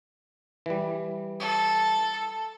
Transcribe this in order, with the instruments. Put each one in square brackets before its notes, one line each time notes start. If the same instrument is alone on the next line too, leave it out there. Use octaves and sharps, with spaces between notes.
[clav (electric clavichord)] E3 G3
[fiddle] A4